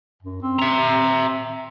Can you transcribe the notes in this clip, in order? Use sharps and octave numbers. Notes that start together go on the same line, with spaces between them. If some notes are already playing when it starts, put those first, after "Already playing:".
F#2
C4
E5 A#5
C4